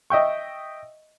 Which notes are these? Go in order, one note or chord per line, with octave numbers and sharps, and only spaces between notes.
D#5 E5 G5 C#6